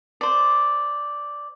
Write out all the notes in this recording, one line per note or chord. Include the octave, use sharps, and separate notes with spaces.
C5 D5